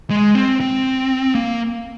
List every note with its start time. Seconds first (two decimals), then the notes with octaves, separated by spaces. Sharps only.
0.10 G#3
0.35 C4
0.60 C4
1.35 A#3